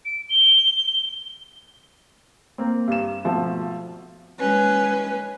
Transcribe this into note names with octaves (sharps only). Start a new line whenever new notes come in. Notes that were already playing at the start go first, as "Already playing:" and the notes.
D7
G7
A#3 C4
G2 E7
G#1 B2 F3 A3 F#4 A5
G#3 C#4 B4